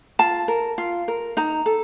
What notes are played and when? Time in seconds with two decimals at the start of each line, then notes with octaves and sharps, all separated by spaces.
0.19 F4 A5
0.48 A#4
0.78 F4
1.08 A#4
1.37 D#4 A#5
1.66 A4